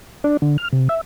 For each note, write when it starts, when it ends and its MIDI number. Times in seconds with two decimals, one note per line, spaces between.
0.24 0.37 62
0.42 0.57 50
0.58 0.68 89
0.73 0.88 48
0.89 1.01 76